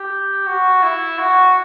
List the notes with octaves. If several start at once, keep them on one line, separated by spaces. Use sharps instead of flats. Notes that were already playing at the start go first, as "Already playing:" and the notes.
Already playing: G4
F#4
E4
F#4